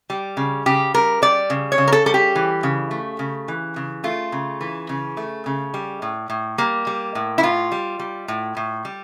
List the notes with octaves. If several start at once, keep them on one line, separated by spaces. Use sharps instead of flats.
G3
C#3
C#3 G4
G3 A#4
G3 D5
C#3
C#5
C#3
A#4
A4
G3 A4
G4
E3
C#3
A3
C#3
E3
C#3
A3 F4
C#3
E3
C#3
A3
C#3
G3
A2
A2
G3 A#3
G3
A2
E4
A2 F4
G3
G3
A2
A2
G3